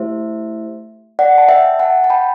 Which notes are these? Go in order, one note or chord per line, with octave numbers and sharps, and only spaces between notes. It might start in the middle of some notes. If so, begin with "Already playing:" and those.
Already playing: A3 E4 G4 C5 E5
D5 F#5
A5
E5 G5
F#5 A5
A5
G5 B5